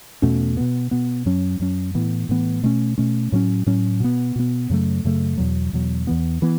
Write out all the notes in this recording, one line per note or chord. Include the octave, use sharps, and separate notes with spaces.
E2 B2 A3 C#4
B2 B3
B2 B3
F#2 F#3 C#4
F#2 F#3 C#4
A2 E3 B3
A2 E3 B3
B2 A3 C#4
B2 A3 C#4
A2 F#3 C#4
A2 F#3 C#4
B2 B3
B2 B3
F#2 C#3 F#3 A3
F#2 C#3 F#3 A3
E2 B2 F#3
E2 B2 F#3
E2 E3 B3
E3 B3